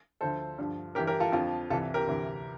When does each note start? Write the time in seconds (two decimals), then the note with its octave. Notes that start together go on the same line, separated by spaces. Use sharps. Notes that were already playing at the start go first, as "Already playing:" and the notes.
0.21 D2 D3 F3 A4 C5
0.58 G2 D3 F3
0.95 G2 G4 A#4
1.00 E3
1.07 G4 A#4
1.20 F4 A4
1.32 F2 D3 F3 F4
1.70 C2 C3 E3 F4 A4
1.94 G4 A#4
2.07 D2 C3 E3